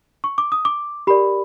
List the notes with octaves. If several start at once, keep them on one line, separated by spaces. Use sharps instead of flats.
C#6
D6
D#6
D6
G4 A#4 D5 B5